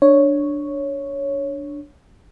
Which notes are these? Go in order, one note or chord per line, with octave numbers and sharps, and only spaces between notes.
D4 C#5